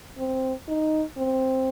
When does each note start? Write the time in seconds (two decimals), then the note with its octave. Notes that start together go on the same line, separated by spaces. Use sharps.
0.18 C4
0.68 D#4
1.18 C4